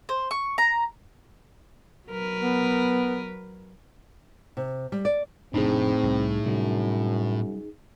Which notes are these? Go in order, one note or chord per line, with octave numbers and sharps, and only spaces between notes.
C5
C#6
A#5
F#3 A#4 B4
B3
C3
G3
D5
F1 A2 C4 D4 D#4 G#4
C2
F#2 C3 G3